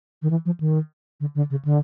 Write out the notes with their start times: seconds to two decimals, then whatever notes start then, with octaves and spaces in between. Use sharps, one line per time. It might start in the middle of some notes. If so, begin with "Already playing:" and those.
0.22 D#3
0.30 E3
0.45 F3
0.60 D#3
1.20 D3
1.35 D3
1.50 C#3
1.65 D3